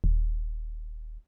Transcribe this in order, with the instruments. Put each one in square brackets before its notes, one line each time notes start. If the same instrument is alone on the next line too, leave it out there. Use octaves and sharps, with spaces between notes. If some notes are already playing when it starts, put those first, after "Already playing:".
[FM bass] D#1